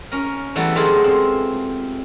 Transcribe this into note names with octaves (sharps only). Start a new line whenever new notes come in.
C#4 A#4
E3 F#3 G3 A3 B3 E4
D3 F#3 G#3 A3 F4 G4
C4